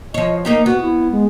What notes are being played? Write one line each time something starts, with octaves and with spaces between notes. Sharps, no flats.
F3 C#5 D#5
A#3 D#4 G4 D#5
B3 F#4
E4
G#3